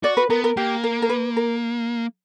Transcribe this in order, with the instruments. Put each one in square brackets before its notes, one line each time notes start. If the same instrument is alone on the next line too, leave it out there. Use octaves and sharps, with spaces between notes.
[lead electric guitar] F#4 [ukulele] D5
[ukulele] B4
[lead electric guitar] B3 [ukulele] A#4
[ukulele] A#4
[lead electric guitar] A#3 [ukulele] G4
[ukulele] A#4
A#4
B4
A#4